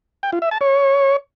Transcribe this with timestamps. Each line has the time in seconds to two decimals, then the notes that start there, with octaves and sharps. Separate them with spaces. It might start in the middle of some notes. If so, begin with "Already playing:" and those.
0.23 G5
0.32 F4
0.42 E5
0.51 A5
0.61 C#5